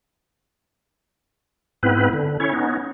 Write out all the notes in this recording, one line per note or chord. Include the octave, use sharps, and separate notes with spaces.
G#2 B3 C4 E4 B4
D3
C#4 E4 C#5
B3 C#4 D#4